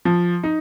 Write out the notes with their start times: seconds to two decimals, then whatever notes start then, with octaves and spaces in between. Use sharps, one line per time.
0.05 F3
0.43 D#4